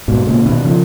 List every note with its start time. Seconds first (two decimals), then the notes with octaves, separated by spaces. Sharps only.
0.08 G#2 B2
0.26 A#2 C#3
0.46 B2 D#3
0.65 C#3 F3